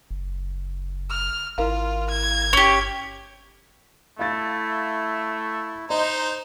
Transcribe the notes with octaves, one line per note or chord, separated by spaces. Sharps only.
F#1
F6
G#1 E4 F4 A#4 F5
G#6
G1 C#4 G4
A3 E4 F5 A6
D#4 C5 D#5